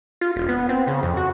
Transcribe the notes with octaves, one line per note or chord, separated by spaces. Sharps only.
F4
E1
B3
C4
C#3
F2
F#4